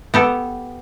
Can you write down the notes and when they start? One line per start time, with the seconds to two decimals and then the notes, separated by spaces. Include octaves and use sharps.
0.14 B3 G4 A4